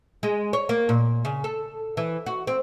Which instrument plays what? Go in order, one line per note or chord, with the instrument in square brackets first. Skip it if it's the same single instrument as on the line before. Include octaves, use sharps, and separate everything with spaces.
[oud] G#3
C#5
A#3
A#2
C#3
A4
E3
F#4
C4